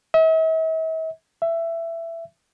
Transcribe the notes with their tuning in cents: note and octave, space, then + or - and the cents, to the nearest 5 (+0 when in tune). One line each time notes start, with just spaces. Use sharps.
E5 -45
E5 +15